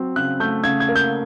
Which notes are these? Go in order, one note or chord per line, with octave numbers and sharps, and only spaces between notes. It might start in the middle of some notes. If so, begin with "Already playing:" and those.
Already playing: F#3 C4
C#3 F#6
A3 G6
C#3 G#6
G#6
A#3
G6